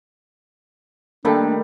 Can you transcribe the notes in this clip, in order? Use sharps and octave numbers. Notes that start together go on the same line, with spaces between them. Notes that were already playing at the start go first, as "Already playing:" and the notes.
D#3 G3 A3 A#3 D4 A4